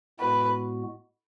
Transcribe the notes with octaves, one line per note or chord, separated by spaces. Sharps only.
A2 G#3 B3 F#4 B4